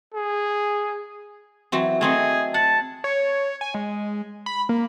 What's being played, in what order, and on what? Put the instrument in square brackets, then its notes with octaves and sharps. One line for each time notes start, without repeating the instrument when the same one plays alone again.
[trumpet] G#4
[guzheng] E3 F#3 C4
[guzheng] A3 C4 D#4 [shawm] G#4
[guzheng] F#5 [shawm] A5
[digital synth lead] C#5
G#5
G#3
B5
A#3